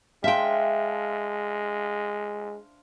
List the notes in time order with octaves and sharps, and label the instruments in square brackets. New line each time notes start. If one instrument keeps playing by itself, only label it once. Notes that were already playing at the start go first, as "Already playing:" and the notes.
[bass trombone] G#3 [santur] D4 C5 F5 [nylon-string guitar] E5 G5